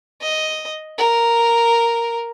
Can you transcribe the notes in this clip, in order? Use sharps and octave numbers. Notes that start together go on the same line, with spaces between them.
D#5
A#4